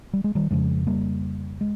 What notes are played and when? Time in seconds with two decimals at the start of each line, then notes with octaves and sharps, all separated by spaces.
0.13 G3
0.24 G#3
0.35 D#3 G3
0.51 F2 C#3 F3 G#3
0.87 G3 A#3
1.61 G#3